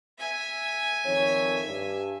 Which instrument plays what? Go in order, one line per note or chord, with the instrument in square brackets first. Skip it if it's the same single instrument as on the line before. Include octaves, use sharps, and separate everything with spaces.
[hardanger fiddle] E5 G#5
[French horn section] F2 D#3 C#5
G2